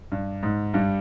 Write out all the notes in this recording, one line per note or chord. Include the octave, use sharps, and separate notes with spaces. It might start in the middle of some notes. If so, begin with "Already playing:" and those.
G2
G#2
G2 G3